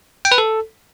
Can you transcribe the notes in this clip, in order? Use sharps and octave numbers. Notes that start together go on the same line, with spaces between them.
G5
B4
A4